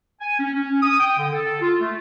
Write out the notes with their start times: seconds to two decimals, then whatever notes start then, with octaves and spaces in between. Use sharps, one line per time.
0.21 G#5
0.39 C#4
0.54 C#4
0.82 D#6
1.00 G5
1.17 D3
1.32 A4
1.61 F4
1.80 A3